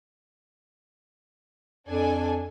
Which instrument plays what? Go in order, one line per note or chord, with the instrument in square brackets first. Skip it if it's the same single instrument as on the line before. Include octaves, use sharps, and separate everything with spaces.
[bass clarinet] F2 [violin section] D4 A4 G#5